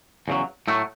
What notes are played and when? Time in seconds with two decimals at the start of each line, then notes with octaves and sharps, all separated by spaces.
0.28 E2 C#3 F#3
0.68 A2 F#3 A3